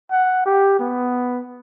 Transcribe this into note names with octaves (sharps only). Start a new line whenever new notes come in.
F#5
G4
B3